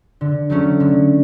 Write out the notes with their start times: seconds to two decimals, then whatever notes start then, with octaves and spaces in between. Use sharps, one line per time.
0.21 D3
0.50 F#3 A3 C#4
0.80 D3